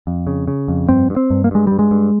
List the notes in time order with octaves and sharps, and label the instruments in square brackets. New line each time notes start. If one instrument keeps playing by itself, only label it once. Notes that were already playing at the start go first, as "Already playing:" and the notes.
[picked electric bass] F2
C#3
C#3
F2
G2 C4
G2
C4
G2
A#3
G2 G#3
G2 G3
G#3
G2